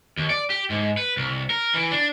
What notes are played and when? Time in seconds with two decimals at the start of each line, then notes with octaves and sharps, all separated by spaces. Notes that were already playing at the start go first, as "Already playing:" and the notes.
0.17 D#2
0.30 D5
0.50 G4
0.70 G#2
0.97 B4
1.17 C2
1.50 A#4
1.74 E3
1.91 D4